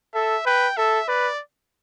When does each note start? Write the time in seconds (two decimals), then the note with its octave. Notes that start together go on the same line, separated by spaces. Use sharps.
0.14 A4 E5
0.46 B4 G5
0.77 A4 E5
1.08 B4 D5